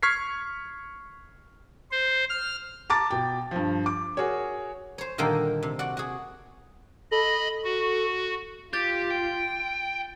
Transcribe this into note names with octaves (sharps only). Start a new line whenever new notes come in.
C#6 F6 G#6 B6 C7
C5
F6
A5 A#5 D6 A6
B2 G5
G2 F3
D6
F#4 G#4 A#4 C#5
C5 C#5
A#2 D3 D#3 G3 A#3 A4
C3
F#4 D5 F#5
F#4 G#4
A4 D#5 B5
F#4
F4 G4 G6 A6
G5